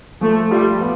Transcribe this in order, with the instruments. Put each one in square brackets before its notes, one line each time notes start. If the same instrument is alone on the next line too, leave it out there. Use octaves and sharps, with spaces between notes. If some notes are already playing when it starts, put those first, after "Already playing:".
[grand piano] F3 [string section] A3
[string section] G3 [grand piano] F4
[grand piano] B3